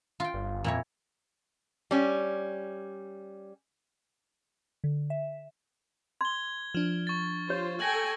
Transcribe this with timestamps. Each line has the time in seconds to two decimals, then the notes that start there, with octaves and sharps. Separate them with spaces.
0.20 F4 G5
0.34 G1
0.64 F2 A#2 E4 C#5
1.91 G3 C#4
4.84 D3
5.10 E5
6.21 C6 G#6 G7
6.75 F3 D4
7.07 C#6 A6
7.50 F4 G4 C5 C#5
7.80 A4 G5 G#5 A#6 F#7